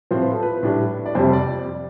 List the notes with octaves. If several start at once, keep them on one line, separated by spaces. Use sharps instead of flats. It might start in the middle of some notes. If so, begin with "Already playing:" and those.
A2 F3 C4 C5
B4
A4
B4
A2 G3 D4
D5
F2 C3 G3 C5
D5